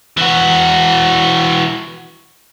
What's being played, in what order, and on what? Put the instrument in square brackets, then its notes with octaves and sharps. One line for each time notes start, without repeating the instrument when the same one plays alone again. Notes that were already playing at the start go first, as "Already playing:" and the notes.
[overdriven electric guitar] E3 F#4